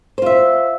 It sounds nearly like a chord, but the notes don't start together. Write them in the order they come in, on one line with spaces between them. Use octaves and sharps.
C5 F4 E5